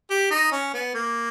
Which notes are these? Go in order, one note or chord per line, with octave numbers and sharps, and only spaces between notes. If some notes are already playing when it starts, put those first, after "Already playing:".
G4
D#4
C#4
B3
A#3